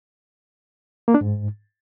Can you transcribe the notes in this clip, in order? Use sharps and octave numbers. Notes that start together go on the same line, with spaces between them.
A#3
D4
G#2